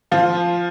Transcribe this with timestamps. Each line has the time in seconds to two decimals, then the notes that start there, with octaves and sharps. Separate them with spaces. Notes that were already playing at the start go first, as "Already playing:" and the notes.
0.11 F3 F4